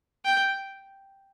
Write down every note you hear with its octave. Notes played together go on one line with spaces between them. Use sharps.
G5